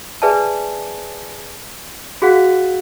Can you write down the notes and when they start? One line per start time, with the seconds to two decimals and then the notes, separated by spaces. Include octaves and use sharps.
0.22 G#4 B4 D5 E5 G#5 A5
2.22 F#4 G#4 F5 F#5 F#6 B6